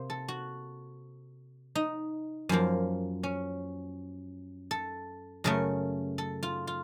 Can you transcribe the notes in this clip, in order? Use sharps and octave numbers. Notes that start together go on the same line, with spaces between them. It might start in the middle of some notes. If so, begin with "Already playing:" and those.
Already playing: C3 A#3 C5
A4
F#4
D#4
F#2 F3 A#3
C#4
A4
F#2 C#3 A3 A#4
A4
F4
F4